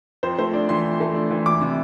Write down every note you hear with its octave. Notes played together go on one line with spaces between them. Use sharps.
F2 C5
A3 C5
D4 D5
E3 C6
F2
A3
D4
E3
E1 D6
C3